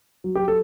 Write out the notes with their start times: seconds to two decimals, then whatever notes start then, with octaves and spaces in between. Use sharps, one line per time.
0.24 F#3
0.35 G4
0.40 F#3
0.48 A4